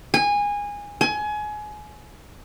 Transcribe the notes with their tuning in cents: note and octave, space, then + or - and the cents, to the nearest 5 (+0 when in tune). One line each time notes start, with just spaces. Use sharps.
G#5 -20
G#5 +25